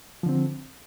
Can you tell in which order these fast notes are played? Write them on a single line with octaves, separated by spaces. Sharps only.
F3 D3 C4